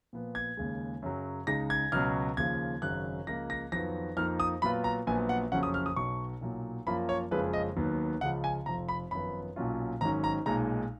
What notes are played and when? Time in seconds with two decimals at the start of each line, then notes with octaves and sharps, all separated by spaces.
0.13 A#2 F3 B3
0.35 G#6
0.57 D#2 C#3 G#3
1.02 F#2 C#3 F#3
1.47 C#2 C#3 G#3 D#4 A#6
1.70 G#6
1.92 C#2 B2 F#3 C#4 F6
2.37 D#2 C#3 F3 G#6
2.82 G#1 F#2 C#3 F#3 F#6
3.27 C#2 C#3 F3 A#3 A#6
3.50 A#6
3.72 F2 D#3 F#3 B3 F4 A#6
4.17 F2 F3 A#3 D#4 F6
4.40 D#6
4.62 A#2 F#3 B3 F4 B5
4.84 A#5
5.07 A#1 A#2 F#3 B3 G#5
5.29 F#5
5.52 F#1 F2 C#3 F#3 C#4 F#5
5.63 D#6
5.74 F6
5.86 D#6
5.96 B1 B2 F#3 C#6
6.41 B1 A#2 F#3
6.87 F#2 F3 A#3 F4 B5
7.09 C#5
7.31 F#1 F2 C#3 F3 G#3 B4
7.53 D#5
7.76 D#2 D#3 F#3 B3
8.21 C#2 C#3 F3 F#5
8.44 G#5
8.66 F1 F2 F3 A#5
8.89 B5
9.11 G#1 F#2 F3 B3 B5
9.56 B1 A#2 F#3 C#4 F4
10.01 G#1 G#2 D#3 F#3 C#4 A#5
10.24 A#5
10.46 B1 A#2 G#3 D#4 A#5